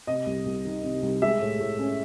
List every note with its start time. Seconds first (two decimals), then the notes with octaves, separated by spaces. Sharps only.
0.07 C3 D#5
0.26 C2
0.46 C2
0.65 D#3
0.83 C3
1.02 C2
1.22 G#3 E5
1.41 A2
1.60 A2
1.79 C#4